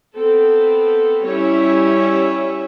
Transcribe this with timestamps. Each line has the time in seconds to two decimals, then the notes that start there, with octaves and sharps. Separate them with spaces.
0.16 B3 C4 A4
1.23 G3 C#4 E4 C#5 E5